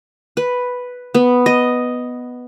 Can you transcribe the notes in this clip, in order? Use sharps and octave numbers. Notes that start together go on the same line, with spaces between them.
B4
B3
D#5